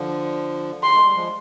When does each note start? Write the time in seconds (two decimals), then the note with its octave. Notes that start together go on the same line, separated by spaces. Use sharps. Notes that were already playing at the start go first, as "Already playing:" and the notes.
Already playing: D3 F3
0.83 C6
0.94 G#3
1.04 G3
1.15 F3 G#3